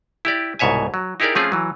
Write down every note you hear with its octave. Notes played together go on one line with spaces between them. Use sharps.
E4 G4 D5
C2 G#2 B2 C#5 E5 G#5
F#3
D#4 E4 G4 G#4 A#4 D5
F3 A3 C4 C#4 F4 G#4
E3 F#3